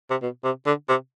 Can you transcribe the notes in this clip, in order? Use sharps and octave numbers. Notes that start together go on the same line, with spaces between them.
C3
B2
C3
D3
C3